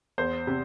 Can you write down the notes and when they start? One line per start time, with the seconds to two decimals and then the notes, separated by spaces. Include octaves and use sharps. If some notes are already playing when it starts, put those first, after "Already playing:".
0.18 E2 C5
0.47 C3